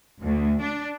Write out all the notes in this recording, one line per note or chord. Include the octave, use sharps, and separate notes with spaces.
D2
D4